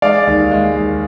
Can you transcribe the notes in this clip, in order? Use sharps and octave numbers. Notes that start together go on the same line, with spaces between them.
G#3 D5 F5
D#2
G#3
D#2